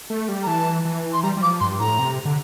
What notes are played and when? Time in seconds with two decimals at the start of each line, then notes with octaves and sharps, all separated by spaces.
0.10 A3
0.28 G3
0.43 A#5
0.47 E3 A5
0.85 E3
1.13 C6
1.23 G3 A#5
1.37 G3
1.42 F3 D6
1.60 G2 C6
1.80 A2 A#5
1.99 C3
2.25 D3